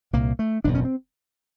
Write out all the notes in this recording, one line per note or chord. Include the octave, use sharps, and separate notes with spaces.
C2 A#2 A#3
A3
F#1 E2 B2 D4
C#4
C4